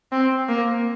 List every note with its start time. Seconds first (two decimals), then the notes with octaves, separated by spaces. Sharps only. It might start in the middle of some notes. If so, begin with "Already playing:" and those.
0.12 C4
0.48 A#3